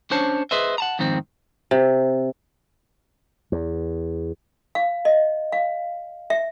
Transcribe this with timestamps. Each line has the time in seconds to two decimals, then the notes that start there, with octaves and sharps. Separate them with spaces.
0.11 C#4 D4 C5 C#5 A5
0.51 G#4 B4 C5 D#5 E5
0.78 F#5 A5 A#5
0.99 F2 G#2 D#3 C4
1.71 C3
3.52 E2
4.75 F5
5.05 D#5
5.52 F5
6.30 E5